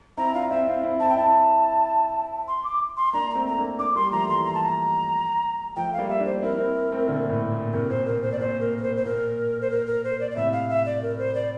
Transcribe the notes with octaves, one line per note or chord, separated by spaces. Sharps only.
C4 E4 A#5
D4 F4 F5
C4 E4 E5
C4 E4 F5
C4 E4
C4 E4 A5
G5
C4 E4 A5
C6
D6
C6
A#3 D4 A#5
A3 C4 A#5
A#5
A#3 D4
A#3 D4 D6
G3 A#3 C6
F3 A3 A#5
E3 G3 C6
A#5
A5
A#5
F3 A3 G5
F5
G3 A#3
E5
A#3 D4
C5
C4 E4 A#4
C4 E4
A3 C4
A#2 D3
A2
A#2
A2 C3 A#4
A#2 C5
A#2 A#4
C5
D5
A#2 C5
A#4
A#4
C5
C5
A#2 A#4
C5
A#4
A#4
C5
D5
D5
A2 C3 E5
F5
E5
D5
A#4
C5
D5